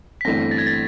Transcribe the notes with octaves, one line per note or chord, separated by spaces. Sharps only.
B6
G1 G2 E3 A3 C4 A#6
A6
G#6
A6